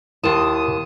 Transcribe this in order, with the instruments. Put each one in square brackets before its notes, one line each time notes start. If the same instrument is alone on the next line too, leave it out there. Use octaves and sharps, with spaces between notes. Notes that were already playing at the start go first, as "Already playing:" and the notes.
[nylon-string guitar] D#2 A5 [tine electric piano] E4 A#4 C6 [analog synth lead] D#6